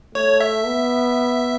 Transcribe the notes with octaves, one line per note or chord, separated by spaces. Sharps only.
A3 C#5
E5
B3